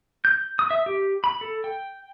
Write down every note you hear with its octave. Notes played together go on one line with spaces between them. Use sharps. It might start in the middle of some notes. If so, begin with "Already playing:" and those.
G6
D#6
E5
G4
B5
A4
G5